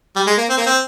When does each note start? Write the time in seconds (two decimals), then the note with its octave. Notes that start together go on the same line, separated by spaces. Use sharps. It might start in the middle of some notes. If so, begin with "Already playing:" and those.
0.16 G3
0.27 G#3
0.38 A#3
0.49 C4
0.57 A#3
0.66 C4